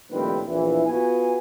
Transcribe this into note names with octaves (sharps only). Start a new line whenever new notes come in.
A#1 A2 D#3 G3 C4 B4
A#1 E2 E3
B3 F4 F#4 G#4 B4 G#5